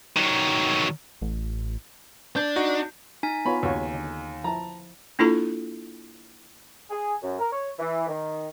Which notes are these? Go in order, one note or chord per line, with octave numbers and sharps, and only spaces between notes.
D#3 F#3
A1
D4 G6
D#4 F#4
D#4 G#5 B6
B3 F4 C#5 B5
D#2 C#3 F#4 C#5
D3
F3 E4 A5 A#5
A#3 D4 E4 F4 A4 A#5
G#4
F#2
A#4
C#5
E3
D#3